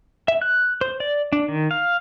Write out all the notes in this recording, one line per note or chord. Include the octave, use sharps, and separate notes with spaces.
E5
F#6
C5
D5
D4
D#3
F5